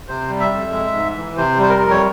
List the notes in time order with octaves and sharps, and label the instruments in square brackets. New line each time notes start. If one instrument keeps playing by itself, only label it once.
[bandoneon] C3 C5
G3
E5
F2
G#3
G#2
E3
C3 C5
G3 C5
A#4
F2
C#5